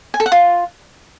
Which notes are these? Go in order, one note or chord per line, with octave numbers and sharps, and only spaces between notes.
G#5
A4
F#5
F4